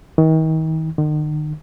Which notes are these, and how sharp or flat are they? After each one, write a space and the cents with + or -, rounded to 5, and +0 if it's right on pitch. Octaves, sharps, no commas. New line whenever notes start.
D#3 +40
D#3 -40